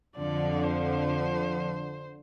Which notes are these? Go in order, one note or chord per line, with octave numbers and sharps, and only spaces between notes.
F2 D3 F3 D5
C5